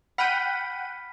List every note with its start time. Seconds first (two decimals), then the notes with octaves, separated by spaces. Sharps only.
0.18 F#5 G5 B5 F6 B6 D#7